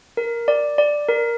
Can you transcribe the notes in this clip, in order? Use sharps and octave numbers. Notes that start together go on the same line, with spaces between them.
A#4
D5
D5
A#4